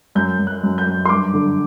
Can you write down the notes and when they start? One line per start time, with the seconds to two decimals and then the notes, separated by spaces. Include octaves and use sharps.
0.15 F#2 G6
0.39 F#2
0.47 F#6
0.63 F#2
0.78 G6
0.86 F#2
1.05 C6
1.09 G2 D6
1.33 D3